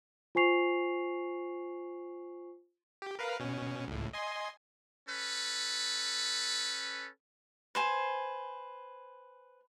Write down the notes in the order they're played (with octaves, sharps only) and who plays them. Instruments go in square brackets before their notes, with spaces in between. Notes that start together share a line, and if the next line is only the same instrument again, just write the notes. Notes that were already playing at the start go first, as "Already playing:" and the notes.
[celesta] F4 C5 G#5 C#6 C7 F7
[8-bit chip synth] G4
A#4 B4 F5
B2 C#4
C#2 A2
D#5 G#5 C6
[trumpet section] C#4 A4 B4
[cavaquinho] B4 C5 G#5